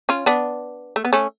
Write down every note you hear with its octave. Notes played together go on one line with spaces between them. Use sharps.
C#4 F4
B3 D4
A3
B3
A3 C#4